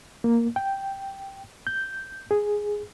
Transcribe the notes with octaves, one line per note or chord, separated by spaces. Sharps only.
A#3
G5
G6
G#4